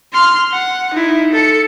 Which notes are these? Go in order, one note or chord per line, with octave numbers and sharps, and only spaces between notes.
C6 F6
F#5
D#4 E4
A4 C#7